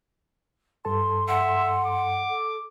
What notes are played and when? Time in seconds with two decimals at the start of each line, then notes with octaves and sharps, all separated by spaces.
0.85 G2 A4 A5 C6
1.28 E5 F#5
1.86 D6
2.29 A4